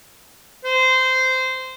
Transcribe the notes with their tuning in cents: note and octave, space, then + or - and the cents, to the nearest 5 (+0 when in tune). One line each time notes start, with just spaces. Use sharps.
C5 -15